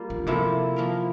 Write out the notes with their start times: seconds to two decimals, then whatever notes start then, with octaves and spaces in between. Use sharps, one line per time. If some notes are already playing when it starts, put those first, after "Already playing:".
Already playing: G3 A#3 F4
0.10 D3
0.26 C3 F3 A#3 E4 A4
0.76 F3 A#3 E4 A#4